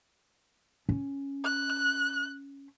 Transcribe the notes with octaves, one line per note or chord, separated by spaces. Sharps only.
C#4
F#6